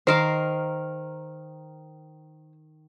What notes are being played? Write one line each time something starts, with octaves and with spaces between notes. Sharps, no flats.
D#3 A#4 C5 F5